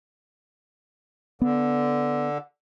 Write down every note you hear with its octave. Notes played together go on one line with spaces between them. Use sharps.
D3 B3